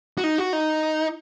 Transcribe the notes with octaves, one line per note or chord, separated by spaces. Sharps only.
F#4
D#4
F#4
D#4